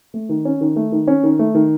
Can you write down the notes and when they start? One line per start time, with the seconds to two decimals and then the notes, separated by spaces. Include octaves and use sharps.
0.14 A3
0.29 D#3
0.45 C#4
0.61 D#3
0.76 A3
0.92 D#3
1.08 C#4
1.23 D#3
1.39 A3
1.55 D#3